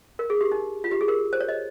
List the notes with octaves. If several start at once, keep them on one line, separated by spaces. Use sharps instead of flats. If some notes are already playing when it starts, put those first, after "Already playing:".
A#4
G#4
G4
D#4
F4
G4
G#4
A#4
C5
C#5
D#5